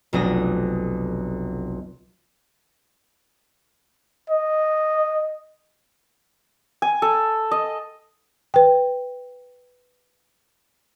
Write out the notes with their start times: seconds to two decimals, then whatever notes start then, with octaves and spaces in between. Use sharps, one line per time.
0.13 F1 B1 D4 D#6 A#6
4.30 D#5
6.82 G#5
7.02 A4
7.51 D#5
8.54 B4 G5